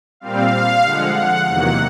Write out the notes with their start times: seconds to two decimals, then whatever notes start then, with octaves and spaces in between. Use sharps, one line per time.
0.20 A#2 G3 C4 F5
0.83 D3 F3 G#3 F#5
1.14 F#5
1.46 E2 C3 D#3 F#3 A#3 F#5